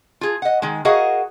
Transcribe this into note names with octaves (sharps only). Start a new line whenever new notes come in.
F4 G#4
D#5 F#5
D#3 G#3
F#4 G#4 A#4 D#5 F5 F#5